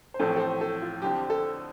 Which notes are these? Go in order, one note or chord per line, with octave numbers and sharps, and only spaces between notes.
C5
A1 A2 F3 A3 C4 A4
A4
C5
A4
F4
F2 D3 F3 C4 G4
A4